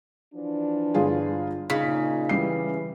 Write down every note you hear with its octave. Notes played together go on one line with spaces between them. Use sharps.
E3 F3 D4
G1 F4 G#4
A#2 C#3 D#4 B6
E3 G3 C7